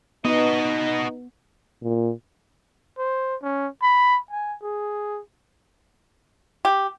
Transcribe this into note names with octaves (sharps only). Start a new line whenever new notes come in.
B3 D#4 F#4 D#5
A#2
C5
C#4
B5
G#5
G#4
G4